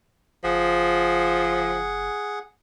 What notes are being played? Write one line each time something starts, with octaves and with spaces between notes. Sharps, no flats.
F#1 F3 G#4 F#5